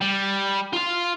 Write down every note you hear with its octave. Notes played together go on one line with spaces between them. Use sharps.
G3
F4 C6